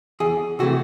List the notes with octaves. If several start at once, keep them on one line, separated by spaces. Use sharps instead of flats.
E2 G#4
C3 E3 A3 F#4